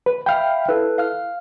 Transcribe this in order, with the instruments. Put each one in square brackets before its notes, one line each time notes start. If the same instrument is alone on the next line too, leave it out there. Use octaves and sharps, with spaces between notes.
[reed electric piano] B4
[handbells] E5 F5 B5 [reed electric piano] G5 F6
[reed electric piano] E4 [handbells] A4 B4
[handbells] F5 F6